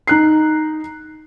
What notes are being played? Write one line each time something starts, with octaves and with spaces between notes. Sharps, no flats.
D#4 F#6 C7